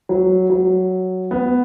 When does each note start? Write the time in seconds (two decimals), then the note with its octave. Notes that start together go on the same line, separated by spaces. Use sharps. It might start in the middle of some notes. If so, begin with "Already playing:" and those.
0.09 F#3
0.50 F#3
1.31 B3